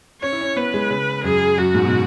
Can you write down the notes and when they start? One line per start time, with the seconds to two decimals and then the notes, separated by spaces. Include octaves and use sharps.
0.22 C#4 C#5
0.32 E4
0.41 C#4
0.56 B3 B4
0.74 G#3
0.90 C#3
1.24 F#2 G#4
1.58 F#2 F#4
1.75 G#2
1.85 B2